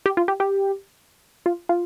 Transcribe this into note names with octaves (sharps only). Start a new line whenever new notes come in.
G4
F4
G4
G4
F4
F4